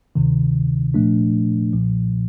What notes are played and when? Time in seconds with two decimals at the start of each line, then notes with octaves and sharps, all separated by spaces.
0.15 D2 C3 D#3
0.94 A#2 F3 A3 D4
1.73 B1 A#2 F3